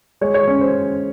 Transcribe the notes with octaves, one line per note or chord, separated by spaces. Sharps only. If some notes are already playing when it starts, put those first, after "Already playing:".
G#3 C#5
C#5
C#4
C5